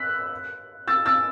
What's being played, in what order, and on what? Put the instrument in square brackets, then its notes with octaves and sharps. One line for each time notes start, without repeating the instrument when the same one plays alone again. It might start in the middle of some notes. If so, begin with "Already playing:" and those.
Already playing: [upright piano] E6 F#6 B6
E6 A6
E6 A6